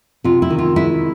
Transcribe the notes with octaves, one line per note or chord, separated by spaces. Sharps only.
C3 F4
E4
D#3
F4
G#3 E4